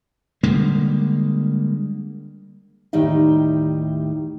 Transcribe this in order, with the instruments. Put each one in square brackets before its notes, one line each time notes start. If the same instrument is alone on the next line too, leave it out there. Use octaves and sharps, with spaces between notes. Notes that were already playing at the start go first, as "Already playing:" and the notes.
[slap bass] D3 G3 G#3 A#3
[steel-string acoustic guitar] D#2 A2 D#3 G3 D#4 E5